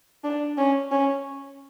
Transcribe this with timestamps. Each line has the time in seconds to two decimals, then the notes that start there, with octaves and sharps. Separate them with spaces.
0.24 D4
0.58 C#4
0.91 C#4